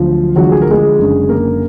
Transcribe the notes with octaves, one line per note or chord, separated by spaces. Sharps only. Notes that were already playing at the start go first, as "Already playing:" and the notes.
Already playing: D2 D3 F3 F#3 F4
D2 D3 F3 F#3 G#3 F#4
G#4
A#4
G#3 G#4
F#1 F#2 D3
A#3 A#4